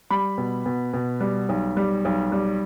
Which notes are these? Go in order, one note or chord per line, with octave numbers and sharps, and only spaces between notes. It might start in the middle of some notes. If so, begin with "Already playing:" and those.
G3 B5
B2
B2
B2
G3
B1
G3
B1
G3